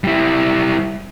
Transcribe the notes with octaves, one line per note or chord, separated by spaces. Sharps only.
G3 E4